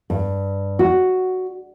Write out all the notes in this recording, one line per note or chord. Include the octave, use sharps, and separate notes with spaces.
G2
F#4